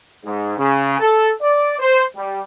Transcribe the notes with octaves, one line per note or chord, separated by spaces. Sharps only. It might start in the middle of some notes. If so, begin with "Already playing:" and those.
G#2
C#3
A4
D5
C5
G3